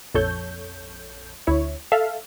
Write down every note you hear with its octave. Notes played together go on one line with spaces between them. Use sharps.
A#1 F2 A4 C#5 G6
D2 E4 C#5
A4 E5 F5